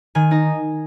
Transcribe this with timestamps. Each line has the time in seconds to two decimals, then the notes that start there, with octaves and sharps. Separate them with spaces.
0.15 D#3 G#5
0.31 D#4 D#5